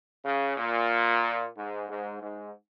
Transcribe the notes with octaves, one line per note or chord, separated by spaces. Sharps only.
C#3
A#2
G#2
G#2
G#2